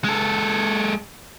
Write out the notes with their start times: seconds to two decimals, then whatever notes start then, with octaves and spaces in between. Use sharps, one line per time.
0.04 G#3 A4